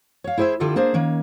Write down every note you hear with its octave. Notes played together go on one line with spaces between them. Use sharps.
C#5 F5
E4 G#4 C5 D5 E5
D3 E4 F4 G4 A4
A#3 D4 G#4 C5
D#3 A#3 C#4